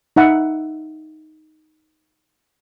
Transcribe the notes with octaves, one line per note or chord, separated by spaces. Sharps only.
D#4 E5 F#5 B5